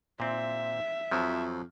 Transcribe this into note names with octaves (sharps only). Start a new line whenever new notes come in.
A#2 C4 E5
F2 F3 F#3